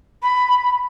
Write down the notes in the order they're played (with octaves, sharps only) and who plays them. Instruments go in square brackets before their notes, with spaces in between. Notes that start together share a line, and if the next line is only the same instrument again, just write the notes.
[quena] B5